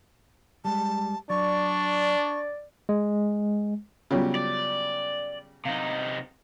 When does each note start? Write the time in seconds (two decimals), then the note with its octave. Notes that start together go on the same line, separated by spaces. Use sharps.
0.65 G3 G#3 A5
1.30 F#3 D4 D5 C#6
2.89 G#3
4.11 C#3 F#3 G3 B3 F4 C#5
4.35 D5
5.65 C3 D#4 F5